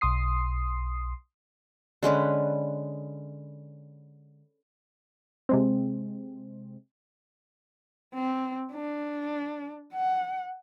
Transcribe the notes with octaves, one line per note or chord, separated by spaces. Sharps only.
B1 C6 D#6 C7
D3 G#3 C#4 B4
C3 G#3 C4
C4
D4
F#5